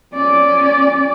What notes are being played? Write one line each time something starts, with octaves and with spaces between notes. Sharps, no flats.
C#4 D5